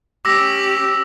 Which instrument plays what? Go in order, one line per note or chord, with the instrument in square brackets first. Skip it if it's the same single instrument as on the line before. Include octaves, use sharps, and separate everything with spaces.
[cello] C#4 G4 [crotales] D6 E6 A#6